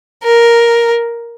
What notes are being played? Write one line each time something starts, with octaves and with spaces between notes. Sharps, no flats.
A#4